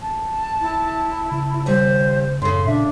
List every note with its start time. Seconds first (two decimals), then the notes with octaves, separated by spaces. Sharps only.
0.02 A5
0.61 E4
1.32 C#3
1.66 D#2 G3 C5
2.42 F#2 A2 C#3 C6
2.66 A#2 D4 E5